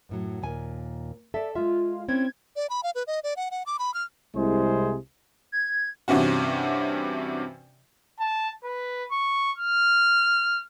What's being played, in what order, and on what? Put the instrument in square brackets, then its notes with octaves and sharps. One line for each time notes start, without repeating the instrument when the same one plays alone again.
[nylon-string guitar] F#2 A2 F#3
D#2 A#2 G#5
[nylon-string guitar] A4 D5 [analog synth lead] E5
[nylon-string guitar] G#3 E5 [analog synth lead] F4
[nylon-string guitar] C4 C#4 E4 [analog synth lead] G#6
[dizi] D5
B5
F5
B4
D#5
D5
F#5
F#5
D6
B5
F6
[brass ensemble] C2 C3 G#3 E4 G#4 C5
[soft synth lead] G#6
[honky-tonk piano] G2 C3 E3 C#4 F#4
[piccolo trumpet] A5
B4
C#6
F6